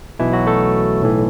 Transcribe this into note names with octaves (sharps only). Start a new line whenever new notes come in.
B1 B2 E3 E4
F#3 F#4
A3 A4
B1 A2 E3